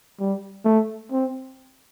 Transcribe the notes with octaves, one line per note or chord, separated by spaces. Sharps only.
G3
A3
C4